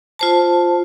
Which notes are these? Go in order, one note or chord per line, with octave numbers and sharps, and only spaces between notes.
F4 C5 A5